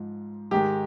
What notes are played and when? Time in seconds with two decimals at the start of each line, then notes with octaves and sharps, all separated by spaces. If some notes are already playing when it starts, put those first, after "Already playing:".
Already playing: G#2 F3
0.51 G#2 D#3 G#3 G4